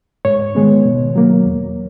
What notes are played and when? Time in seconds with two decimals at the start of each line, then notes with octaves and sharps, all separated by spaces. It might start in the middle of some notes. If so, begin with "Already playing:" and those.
0.25 G#2 C#5
0.55 D#3 G#3 B3
0.85 B2
1.16 F#3 A#3
1.45 E2